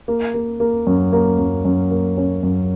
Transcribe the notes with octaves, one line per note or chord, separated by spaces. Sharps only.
A#3
A#3
A#3
F#2
A#3
F#2
F#2
A#3
C#4
F#2